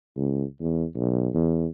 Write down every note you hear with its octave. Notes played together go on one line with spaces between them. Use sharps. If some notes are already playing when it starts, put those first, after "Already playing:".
C#2
E2
B1
E2